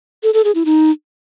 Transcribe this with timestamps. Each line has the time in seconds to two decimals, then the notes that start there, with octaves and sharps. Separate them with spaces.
0.23 A4
0.34 A4
0.44 G#4
0.55 E4
0.65 D#4